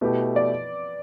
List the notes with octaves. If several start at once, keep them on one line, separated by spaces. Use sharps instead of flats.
B2 A3 E4 G4 B4
D5